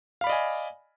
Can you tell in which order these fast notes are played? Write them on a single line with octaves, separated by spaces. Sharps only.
F5 B5 D5 D#5 G#5